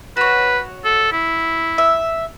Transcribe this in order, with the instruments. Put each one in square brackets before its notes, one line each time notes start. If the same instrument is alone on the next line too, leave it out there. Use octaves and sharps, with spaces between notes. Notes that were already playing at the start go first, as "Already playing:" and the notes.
[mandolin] F#4 C#5 [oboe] B4
[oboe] A4
E4
[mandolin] E5